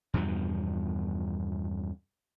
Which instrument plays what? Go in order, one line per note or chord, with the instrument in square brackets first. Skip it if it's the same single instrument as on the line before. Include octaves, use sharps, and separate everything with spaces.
[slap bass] E2 G2 B2 F3